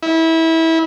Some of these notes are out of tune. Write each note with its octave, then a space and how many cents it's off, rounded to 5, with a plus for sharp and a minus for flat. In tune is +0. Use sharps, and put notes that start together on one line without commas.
E4 -25